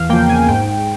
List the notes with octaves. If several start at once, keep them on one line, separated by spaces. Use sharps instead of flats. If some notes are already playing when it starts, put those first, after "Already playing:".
Already playing: E2 F5
C#3 F3 A#3 G5
G#5
G#2 G5